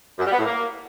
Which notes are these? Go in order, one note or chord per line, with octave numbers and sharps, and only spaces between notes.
F#2
G3
B3
A2
A#3